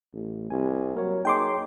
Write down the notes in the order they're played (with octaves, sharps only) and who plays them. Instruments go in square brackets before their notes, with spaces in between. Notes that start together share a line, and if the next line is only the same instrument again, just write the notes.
[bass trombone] A1
[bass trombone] C2 [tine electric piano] G#5
[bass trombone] F#3 [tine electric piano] A#3 A#4 C#5
[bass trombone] A#3 [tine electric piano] D#4 G#4 C#5 [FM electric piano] G5 C6 D6